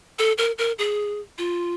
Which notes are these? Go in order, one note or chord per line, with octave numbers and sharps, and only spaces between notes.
A4
A#4
A#4
G#4
F4